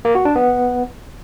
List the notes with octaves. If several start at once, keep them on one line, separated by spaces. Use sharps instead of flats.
A#3
F#4
D4
B3